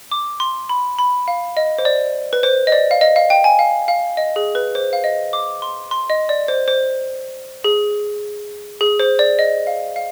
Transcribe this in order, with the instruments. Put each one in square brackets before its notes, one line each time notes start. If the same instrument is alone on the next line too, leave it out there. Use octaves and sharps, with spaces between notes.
[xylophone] D6
C6
B5
B5
F5
D#5
C5
D5
B4
C5
D#5
D5
F5
D#5
F5
G5
G#5
F5
F5
D#5
G#4
B4
C5
F5
D#5
D6
C6
C6
D#5
D5
C5
C5
G#4
G#4
C5
D5
D#5
F5
F5